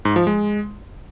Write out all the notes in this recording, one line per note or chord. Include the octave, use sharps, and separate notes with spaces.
G#2
F3
G#3